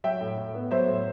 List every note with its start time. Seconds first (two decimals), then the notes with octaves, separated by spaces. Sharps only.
0.04 F#3 E5 G5
0.21 A2
0.38 A2
0.54 B3
0.71 F#3 C5 E5
0.87 A2